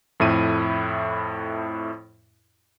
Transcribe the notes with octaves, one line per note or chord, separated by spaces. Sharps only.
F2 A2 E4 D#7